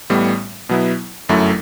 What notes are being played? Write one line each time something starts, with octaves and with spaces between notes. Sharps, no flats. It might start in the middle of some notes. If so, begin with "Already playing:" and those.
A1 A2 G3 B3
B2 F#3 B3 E4
G1 F#2 F#3 A3 E4